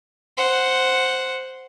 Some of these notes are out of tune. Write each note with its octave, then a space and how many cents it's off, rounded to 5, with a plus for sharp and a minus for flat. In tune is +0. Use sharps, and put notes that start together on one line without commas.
C5 +0 F#5 +0